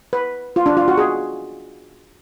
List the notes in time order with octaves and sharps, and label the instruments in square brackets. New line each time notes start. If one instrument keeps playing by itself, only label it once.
[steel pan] B4
F4
D4
F4
F#4
G#4